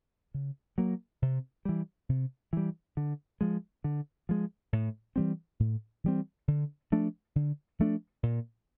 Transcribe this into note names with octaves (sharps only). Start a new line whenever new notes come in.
C#3
F#3 A#3
C3
E3 G3
C3
E3 G3
D3
F3 G#3
D3
F3 G#3
A2
E3 G3 C4
A2
E3 G3 C4
D3
F3 A3 D4
D3
F3 A3 D4
A#2